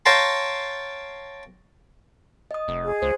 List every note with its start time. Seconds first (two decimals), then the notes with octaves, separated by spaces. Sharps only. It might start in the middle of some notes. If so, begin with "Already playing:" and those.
0.06 C#5 F5 G5 A5 A#5 C6
2.51 D#5 D#6
2.68 F1
2.84 G#4
3.02 C#2 C5